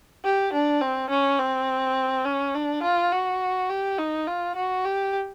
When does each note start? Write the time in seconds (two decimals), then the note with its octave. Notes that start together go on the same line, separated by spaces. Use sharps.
0.24 G4
0.53 D4
0.81 C4
1.10 C#4
1.39 C4
2.25 C#4
2.55 D4
2.83 F4
3.11 F#4
3.70 G4
3.98 D#4
4.27 F4
4.56 F#4
4.85 G4